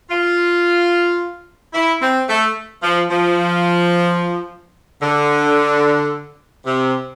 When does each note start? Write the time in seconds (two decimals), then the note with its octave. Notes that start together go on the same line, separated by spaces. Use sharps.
0.10 F4
1.74 E4
2.02 C4
2.29 A3
2.83 F3
3.10 F3
5.02 D3
6.66 C3